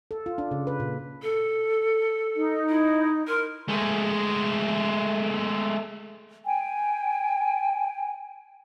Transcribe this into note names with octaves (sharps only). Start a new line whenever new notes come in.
A4
F4
D4
C#3
B4
A#2
A4
D#4 D#5
E4
A#4 C6 F6
G#3 A3
G5 G#5